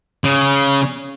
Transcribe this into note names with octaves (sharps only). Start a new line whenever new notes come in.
C#3